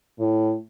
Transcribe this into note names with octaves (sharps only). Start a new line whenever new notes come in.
A2